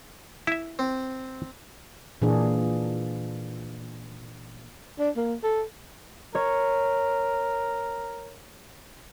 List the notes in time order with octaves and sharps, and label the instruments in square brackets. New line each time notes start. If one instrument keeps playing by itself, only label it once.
[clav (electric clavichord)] E4 E5
[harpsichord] C4
[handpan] A#2 E3 A#3 D4 G#4
[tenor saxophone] D4
A#3
A4
[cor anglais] A#4 [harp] C#5